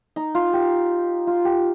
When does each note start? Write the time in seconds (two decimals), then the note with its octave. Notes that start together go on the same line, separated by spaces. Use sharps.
0.16 D#4
0.35 F4
0.53 G4
1.27 F4
1.45 G4